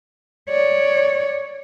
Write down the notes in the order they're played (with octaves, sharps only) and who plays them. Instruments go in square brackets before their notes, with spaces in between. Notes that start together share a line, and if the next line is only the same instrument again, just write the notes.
[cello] C#5 [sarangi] D5